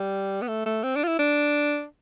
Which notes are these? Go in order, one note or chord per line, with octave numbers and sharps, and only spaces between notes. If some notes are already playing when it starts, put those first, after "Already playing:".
Already playing: G3
B3
A3
A3
C4
D4
F4
E4
D4